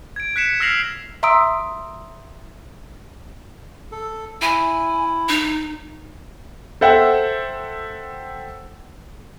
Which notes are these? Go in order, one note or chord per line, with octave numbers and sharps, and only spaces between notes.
G#6 D7
F#6 B6 C#7 E7
E6 F6 A#6 C7 F7 F#7
E5 A#5 C6 D#6 E6 D7
A4
E4 G#5
D#4
A4 C5 E5 F#5 G5